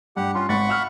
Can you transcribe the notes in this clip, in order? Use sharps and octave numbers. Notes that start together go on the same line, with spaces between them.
G2 G4 F#5
C#4 F4 C6
G#1 F#5 B5 C#6 A6
F5 E6 F6